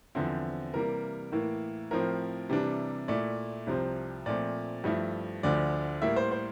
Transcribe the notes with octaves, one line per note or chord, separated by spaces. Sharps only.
E2 D3 F3 C4 E4
C3 E3 G3 A#3 A#4
A2 E3 A#3
A2 F3 C4 A#4
C3 E3 G3 D4
A#2 A3 E4 D5
C2 C3 F3 C4
A#2 F3 A3 C4 D5
G2 F3 A3 E4
D2 D3 F3 D5
A2 G3 A#3 E5
C5
C5